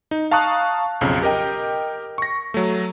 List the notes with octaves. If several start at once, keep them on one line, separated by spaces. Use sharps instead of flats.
D#4
F5 A5 A#5 C#6 D#6 F#6
B1 F2 C#3
G4 A#4 D#5 G5
C#6 A#6
F#3 A3